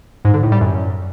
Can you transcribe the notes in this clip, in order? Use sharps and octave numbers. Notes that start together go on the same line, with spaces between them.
G#2
D3
A2
G3
F#2